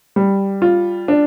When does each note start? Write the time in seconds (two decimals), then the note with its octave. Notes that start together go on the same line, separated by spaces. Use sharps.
0.16 G3
0.62 F4
1.08 D4